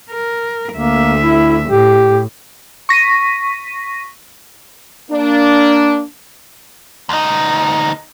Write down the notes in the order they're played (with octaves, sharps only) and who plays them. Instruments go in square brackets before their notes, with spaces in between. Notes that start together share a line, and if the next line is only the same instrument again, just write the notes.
[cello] A#4
[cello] D2 E5 [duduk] A#3
[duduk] E4
[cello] A2 [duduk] G4
[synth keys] C#6 A#6 B6 D#7
[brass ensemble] A#3 D4
[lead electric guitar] D2 D#4